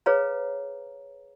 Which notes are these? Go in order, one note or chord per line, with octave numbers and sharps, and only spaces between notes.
G#4 B4 C#5 F5 A#5